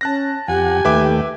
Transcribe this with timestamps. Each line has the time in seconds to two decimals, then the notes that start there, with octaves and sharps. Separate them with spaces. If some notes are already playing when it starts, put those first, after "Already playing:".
0.01 C#4 A5 F#6 A#6
0.48 F2 G4 F#5 G#5
0.85 D#2 A3 B4 E5 G5 D6